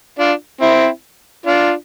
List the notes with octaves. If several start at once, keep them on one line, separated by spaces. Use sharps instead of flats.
D4 F4
C4 E4
D4 F4